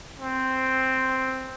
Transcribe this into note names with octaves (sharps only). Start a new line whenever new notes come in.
C4